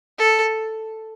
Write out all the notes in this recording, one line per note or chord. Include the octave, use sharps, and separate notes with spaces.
A4